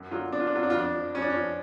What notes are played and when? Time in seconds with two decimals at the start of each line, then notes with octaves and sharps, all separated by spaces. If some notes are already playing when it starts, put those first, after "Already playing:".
Already playing: F#2
0.11 D3 F#3 F4
0.32 F#2 D4
0.40 F4
0.47 D4
0.52 D3 F#3 F4
0.63 D4
0.70 F4
0.74 F2
0.79 D4
0.94 F3
1.14 F2 C#4
1.22 D4
1.30 C#4
1.35 F3